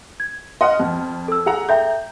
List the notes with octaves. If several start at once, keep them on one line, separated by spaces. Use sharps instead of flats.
G#6
D#5 F#5 C6 F6
F2
A4 E6
G#4 F#5 A#5
A4 E5 G5 A#5 G6